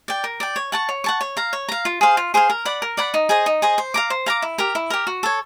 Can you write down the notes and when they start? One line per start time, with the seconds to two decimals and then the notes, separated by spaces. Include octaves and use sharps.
0.08 D5 G5
0.24 A#4
0.40 D5 G5
0.56 C#5
0.72 F#5 A5 C#6
0.89 C#5
1.04 F#5 A5 C#6
1.21 C#5
1.37 F5 A#5
1.53 C#5
1.69 F5 A#5
1.85 F4
2.01 G#4 C5 F5
2.17 F4
2.34 G#4 C5 F5
2.50 A#4
2.65 D5 F#5 B5
2.82 A#4
2.97 D5 F#5 B5
3.14 D#4
3.29 G#4 C5 D#5
3.46 D#4
3.62 G#4 C5 D#5
3.78 C5
3.94 F5 A#5 D6
4.10 C5
4.26 F5 A#5 D6
4.42 E4
4.58 G4 A#4
4.75 E4
4.90 G4 A#4
5.07 F#4
5.23 A4 C#5